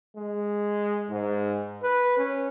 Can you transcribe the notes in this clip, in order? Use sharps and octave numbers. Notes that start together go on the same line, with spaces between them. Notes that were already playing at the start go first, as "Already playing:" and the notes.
G#3
G#2
B4
C#4